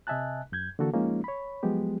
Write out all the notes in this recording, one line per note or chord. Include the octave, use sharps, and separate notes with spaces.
C3 D#5 E5 G#5 A5 F#6
F#2 G6 G#6
D3 E3 A#3 F#4 A4
F3 G#3 A#3 C#4 D#4 F4
C#5 B5
F3 F#3 G#3 B3 G4